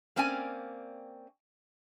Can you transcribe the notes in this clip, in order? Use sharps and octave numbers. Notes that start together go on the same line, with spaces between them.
A#3 C4 C#4 D5 G5 G#5